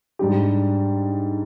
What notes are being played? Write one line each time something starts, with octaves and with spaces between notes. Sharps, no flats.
G#2 G3 D4 G4